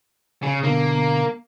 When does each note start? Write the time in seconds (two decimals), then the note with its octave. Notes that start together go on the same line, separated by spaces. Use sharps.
0.43 C#3 G#4
0.64 B2 D3 A#3